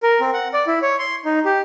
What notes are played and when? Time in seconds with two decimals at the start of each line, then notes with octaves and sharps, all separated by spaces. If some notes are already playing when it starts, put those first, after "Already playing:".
0.03 A#4
0.20 C4
0.34 F#5
0.54 D5
0.67 E4
0.82 C#5
0.99 C6
1.25 D#4
1.45 G4